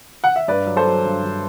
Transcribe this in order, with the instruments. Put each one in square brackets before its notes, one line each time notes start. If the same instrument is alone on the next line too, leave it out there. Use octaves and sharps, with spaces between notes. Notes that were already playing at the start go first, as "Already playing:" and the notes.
[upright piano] F#5
E5
G2 B4 D5
F#3
A4 C5
F#3
G2
G2